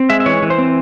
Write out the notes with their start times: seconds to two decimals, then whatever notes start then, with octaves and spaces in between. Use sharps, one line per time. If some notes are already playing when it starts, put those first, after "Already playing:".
Already playing: C4
0.10 G#3 E5
0.20 E5
0.26 E3 C#5
0.42 E3
0.50 C5
0.59 C4